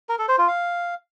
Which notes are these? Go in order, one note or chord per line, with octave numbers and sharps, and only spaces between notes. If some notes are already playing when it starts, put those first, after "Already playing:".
A#4
A4
C5
F4
F5